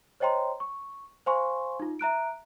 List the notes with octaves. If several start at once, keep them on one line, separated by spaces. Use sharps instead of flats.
C5 C#5 D#5 G5 A#5 C6
C#6
C5 F5 G#5 C6 C#6
D#4 F4
E5 A#5 F#6 D7